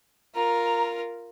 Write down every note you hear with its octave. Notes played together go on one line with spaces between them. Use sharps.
F4 A#4 A#5